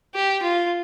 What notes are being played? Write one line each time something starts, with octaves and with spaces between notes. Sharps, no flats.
G4
F4